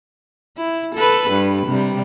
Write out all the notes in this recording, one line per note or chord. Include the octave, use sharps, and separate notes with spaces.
E4
A4 B4
G2
C3 G3